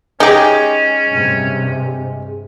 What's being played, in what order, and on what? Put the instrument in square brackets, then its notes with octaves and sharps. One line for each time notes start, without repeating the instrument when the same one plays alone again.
[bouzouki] G#3 [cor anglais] C#4 [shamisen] D#4 G4
[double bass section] G2 C3